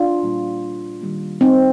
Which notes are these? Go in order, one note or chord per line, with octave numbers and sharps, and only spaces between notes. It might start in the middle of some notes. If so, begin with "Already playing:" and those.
Already playing: D4 F4
A#2 G3 A#3
D#3 G3 A#3
C4 D#4